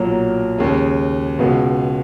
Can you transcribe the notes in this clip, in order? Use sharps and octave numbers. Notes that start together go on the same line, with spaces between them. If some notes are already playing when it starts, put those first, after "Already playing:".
Already playing: B1 A#2 F#3 A#3
D#2 C#3 G#3
C#2 B2 G#3 B3